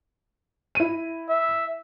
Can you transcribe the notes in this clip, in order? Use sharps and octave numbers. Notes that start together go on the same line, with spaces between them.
E4 D#7
E5